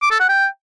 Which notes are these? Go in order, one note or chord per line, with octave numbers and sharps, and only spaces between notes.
D6
A4
F#5
G5